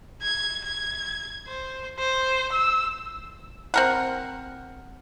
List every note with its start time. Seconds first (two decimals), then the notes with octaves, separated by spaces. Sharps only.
0.22 G#6
0.64 G#6
1.47 C5
1.99 C5
2.53 E6
3.74 C4 A#4 F#5